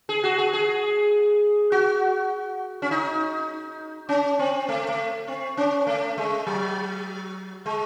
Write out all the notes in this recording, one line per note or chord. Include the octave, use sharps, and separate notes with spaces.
G#4
F#4
G#4
G#4
F#4
C#4
D#4
C#4
C4
A3
A3
C4
C#4
A3
G#3
F#3
G#3